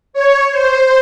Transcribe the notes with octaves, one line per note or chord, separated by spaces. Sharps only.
C#5
C5